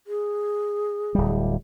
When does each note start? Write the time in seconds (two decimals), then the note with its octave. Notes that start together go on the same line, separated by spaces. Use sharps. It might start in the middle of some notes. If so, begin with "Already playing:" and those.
0.07 G#4
1.15 D1 G3